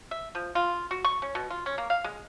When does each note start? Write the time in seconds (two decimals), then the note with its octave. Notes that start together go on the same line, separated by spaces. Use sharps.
0.11 E5
0.35 F3
0.55 F4
0.91 F#4
1.05 C#6
1.22 C#4
1.35 B2
1.50 F4
1.66 C#4
1.78 A#3
1.90 F5
2.04 G#3